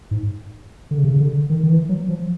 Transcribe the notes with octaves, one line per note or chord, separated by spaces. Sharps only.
G#2
D3
C#3
C3
C#3
D3
D#3
D#3
E3
F#3
F3